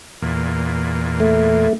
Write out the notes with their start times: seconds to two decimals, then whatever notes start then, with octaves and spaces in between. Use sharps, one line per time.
0.22 E2 A#2
1.20 A3